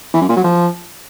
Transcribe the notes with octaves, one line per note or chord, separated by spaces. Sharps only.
E3
F#2
A#2
F#3
F3